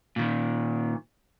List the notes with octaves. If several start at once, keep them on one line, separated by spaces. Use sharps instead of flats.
A#2 D#3